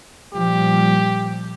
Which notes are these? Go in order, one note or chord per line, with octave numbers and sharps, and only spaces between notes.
A#2 F3 G3 G4